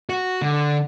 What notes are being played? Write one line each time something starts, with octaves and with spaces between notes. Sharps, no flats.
F#4
D3